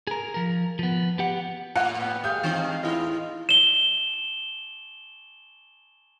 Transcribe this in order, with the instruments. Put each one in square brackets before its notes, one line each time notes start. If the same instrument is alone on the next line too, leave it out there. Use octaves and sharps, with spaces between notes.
[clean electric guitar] G#4 A#4
F3 A#4
F3 B3
B3 G4 F#5
[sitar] A2 [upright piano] F#5
[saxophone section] B3
[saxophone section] G#3 F5 [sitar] G4 [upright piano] D#6 G6
[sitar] E3 C4 D#4
[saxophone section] E2 A2 F4 [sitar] E4 D#5
[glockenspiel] E7 G7